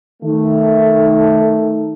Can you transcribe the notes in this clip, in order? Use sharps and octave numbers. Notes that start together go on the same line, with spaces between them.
D#3 A3